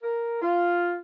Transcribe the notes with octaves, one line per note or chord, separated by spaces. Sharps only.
A#4
F4